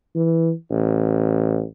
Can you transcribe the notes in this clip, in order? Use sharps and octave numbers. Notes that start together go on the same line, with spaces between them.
E3
A1